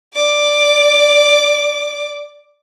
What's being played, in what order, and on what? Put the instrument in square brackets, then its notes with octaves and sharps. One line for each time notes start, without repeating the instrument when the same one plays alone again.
[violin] D5 D6